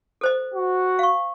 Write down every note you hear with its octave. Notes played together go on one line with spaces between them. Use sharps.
A4 C5 D#5
F#4
F5 C#6